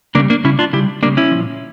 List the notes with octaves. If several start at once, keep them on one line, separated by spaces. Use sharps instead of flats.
C#3 G3 A#3 D4
A#3 D4
C#3 G3 C#4 E4
D4 F4
C#3 G3 E4 G4
C#3 G3 A#3 D4
C#4 E4
A#2 F3